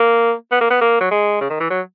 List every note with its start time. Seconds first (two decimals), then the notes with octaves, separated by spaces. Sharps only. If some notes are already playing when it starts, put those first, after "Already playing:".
Already playing: A#3
0.51 B3
0.61 A#3
0.70 B3
0.81 A#3
1.00 F#3
1.11 G#3
1.41 C#3
1.50 D#3
1.60 E3
1.70 F#3